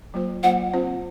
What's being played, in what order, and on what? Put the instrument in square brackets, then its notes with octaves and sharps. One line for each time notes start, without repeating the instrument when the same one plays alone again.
[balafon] F#3 A#3 F4 C5
[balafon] F#3 A#3 F4 C5 [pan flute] F#5
[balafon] C4 F4 C5